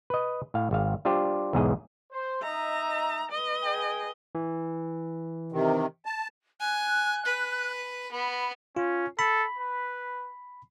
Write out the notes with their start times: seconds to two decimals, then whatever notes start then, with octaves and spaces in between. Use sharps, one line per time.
0.10 B4 D#5
0.54 A2 F5
0.71 G#1 F5
1.05 G3 D4 F4 G4 C5 D5
1.53 B1 E2 G#2 G#4 D#5
2.12 C5
2.42 D#4 D#5 E5 A#5
3.32 B4 D#5
3.63 G#4 G5
4.35 E3
5.52 C3 D#3
6.06 A5
6.60 G#5 F#6
7.25 B4
8.12 B3 B5
8.77 C#4 F4
9.19 A4 B5
9.58 B4